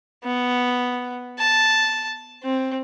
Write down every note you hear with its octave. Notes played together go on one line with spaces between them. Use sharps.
B3
A5
C4